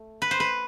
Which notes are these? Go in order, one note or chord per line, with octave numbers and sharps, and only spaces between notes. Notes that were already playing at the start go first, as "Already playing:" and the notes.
Already playing: A3
B4
C5
B4